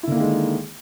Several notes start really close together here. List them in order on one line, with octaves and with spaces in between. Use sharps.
E4 D3 A#3 D#3 G#3